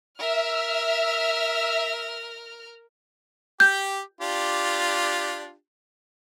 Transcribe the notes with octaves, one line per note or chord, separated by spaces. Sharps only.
A#4 E5 F6
G4 G5 G6
D4 F4 G4